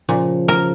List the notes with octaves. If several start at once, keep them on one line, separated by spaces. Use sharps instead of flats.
A#2 C#3 F3
A#4